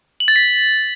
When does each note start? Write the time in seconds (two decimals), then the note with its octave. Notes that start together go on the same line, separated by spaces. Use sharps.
0.20 F#7
0.28 A6
0.36 B6